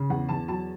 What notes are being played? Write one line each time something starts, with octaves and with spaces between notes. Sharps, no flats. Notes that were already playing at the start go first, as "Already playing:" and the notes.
Already playing: C#3
E2 F#5
E2 A5
F#3 A5